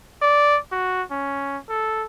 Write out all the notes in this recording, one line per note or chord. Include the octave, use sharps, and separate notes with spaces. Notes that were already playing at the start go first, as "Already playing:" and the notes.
D5
F#4
C#4
A4